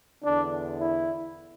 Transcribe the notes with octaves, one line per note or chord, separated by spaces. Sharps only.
E2 D3 D4
E4